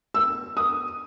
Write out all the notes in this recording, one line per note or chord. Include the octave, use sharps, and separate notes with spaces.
E6
D#6